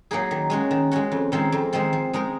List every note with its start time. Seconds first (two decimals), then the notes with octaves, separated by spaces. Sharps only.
0.11 F#3 A#3 D#4 G#4
0.31 D#3
0.50 G#3 C#4 F#4
0.71 D#3
0.92 G#3 C#4 F#4
1.12 F2
1.32 D#3 G#3 C4 F4
1.52 F2
1.73 D#3 G#3 C4 F4
1.93 F3
2.13 G#3 D#4 A#4